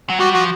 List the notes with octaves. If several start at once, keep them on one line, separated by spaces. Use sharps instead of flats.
F#3
G3 F#4
F3 F#4